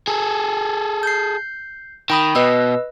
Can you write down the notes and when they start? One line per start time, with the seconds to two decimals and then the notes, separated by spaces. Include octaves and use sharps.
0.08 G#4 A4
1.03 G6 C7
2.10 D#3 G5 B5 D#6
2.35 B2 B4 D#5 E6